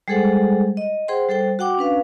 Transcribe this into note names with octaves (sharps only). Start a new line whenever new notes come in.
G3 G#3 G#4 A4 C5 F#5
D#5
G#4 C5 F#5 G5 C6
G3 A4 C5 G5
F#4 F#5 G5 D6
C#4 D4 B4 F5